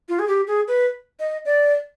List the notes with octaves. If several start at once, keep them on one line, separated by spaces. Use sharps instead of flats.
F4
G#4
G4
G#4
B4
D#5
D5